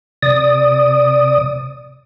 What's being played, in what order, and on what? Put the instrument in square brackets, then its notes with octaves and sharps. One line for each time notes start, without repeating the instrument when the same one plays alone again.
[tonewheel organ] C3 D5 D#6